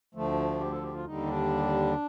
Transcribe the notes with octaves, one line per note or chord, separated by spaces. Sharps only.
D2 D3 F3 A3
G4
A4
G4
F4
D#2 D3 G3 D#4
D4